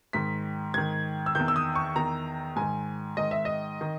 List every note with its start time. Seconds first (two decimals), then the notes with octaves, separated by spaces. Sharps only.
0.13 G#2 D#3 B6
0.74 G#2 D#3 G#6
1.26 E6
1.35 E2 D#3 G6
1.48 E6
1.56 D#6
1.75 C#6
1.96 E2 D#3 A#5
2.56 G#2 D#3 G#5
3.17 G#2 D#3 D#5
3.31 E5
3.45 D#5
3.81 D#3